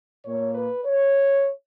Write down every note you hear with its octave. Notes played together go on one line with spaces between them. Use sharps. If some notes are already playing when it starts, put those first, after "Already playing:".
A#2 A#3 C#5
B4
C#5